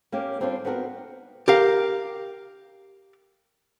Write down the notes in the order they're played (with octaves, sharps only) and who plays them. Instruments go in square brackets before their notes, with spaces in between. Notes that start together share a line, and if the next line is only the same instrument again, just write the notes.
[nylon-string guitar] A#3 C#4 G4
G3 C4 D4 F4 B4 C#5
B3 C4 D#4 F#4 A4 A#4
[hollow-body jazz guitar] G4 A#4 F5